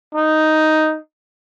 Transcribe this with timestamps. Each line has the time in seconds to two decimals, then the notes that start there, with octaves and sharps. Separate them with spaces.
0.15 D#4